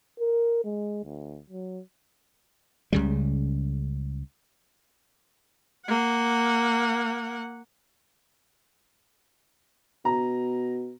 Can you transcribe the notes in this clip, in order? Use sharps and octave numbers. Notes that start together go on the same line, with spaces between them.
A#4
G#3
D2
F#3
C#2 C#3 G3
A#3 F#5
B2 A#5